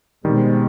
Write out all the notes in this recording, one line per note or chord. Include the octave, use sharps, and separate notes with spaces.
B2 D#3 G3 G#3 C4